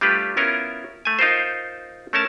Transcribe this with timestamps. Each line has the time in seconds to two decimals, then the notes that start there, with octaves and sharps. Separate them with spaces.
0.01 G3 A3 D4 F4 G4 B4
0.37 B3 C#4 E4 F4 A#4
1.05 A3 G#5
1.19 D#4 F4 A#4 C5
2.13 A3 C#4 A#4 A5